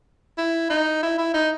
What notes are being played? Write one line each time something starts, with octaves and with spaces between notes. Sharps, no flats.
E4
D#4
E4
E4
D#4